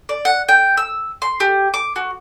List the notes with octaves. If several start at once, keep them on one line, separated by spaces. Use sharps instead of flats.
D5
F#5
G5
E6
C6
G4
D6
F#4